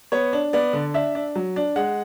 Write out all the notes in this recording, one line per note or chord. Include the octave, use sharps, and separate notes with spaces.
B3 C#5
D4
B3 D5
D3
D4 E5
D4
F#3
D4
G#3 F#5